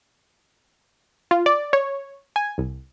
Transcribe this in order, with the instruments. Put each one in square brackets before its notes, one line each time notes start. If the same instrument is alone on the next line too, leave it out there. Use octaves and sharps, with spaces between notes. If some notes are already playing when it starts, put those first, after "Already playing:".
[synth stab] F4
D5
C#5
G#5
C2